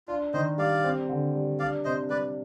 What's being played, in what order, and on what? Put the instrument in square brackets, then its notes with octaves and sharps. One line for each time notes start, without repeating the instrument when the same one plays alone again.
[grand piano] D4 [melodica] F4
[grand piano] D#3 [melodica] C5 D#5
[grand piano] G3 [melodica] D5 F5
[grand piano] C4
D3
G3
[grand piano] D4 [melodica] D5 F5
[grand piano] C3 [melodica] C5 D#5
[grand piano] G3 [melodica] B4 D5